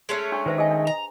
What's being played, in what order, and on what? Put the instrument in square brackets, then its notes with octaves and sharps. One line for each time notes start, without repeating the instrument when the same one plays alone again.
[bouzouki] G#3 A3 C#4
[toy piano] D4 C#6
[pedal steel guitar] D#3 [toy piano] B4 C5 E5
[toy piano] G#4 A4 G#5 [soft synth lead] D#5
[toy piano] D4
[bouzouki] A#5